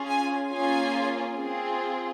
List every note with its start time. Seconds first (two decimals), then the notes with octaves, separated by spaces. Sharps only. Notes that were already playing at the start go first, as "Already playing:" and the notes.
Already playing: C#4 F4 G#4
0.08 G#5
0.52 A#3 C#4 F4 G#4 G#5
1.38 C4 F4 G#4